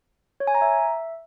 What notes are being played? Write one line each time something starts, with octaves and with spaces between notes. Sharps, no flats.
C#5
G#5
A#5
E5